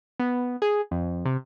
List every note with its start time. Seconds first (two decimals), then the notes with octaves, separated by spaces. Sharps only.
0.20 B3
0.62 G#4
0.91 F2
1.25 C3